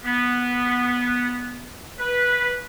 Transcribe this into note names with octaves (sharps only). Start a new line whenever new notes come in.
B3
B4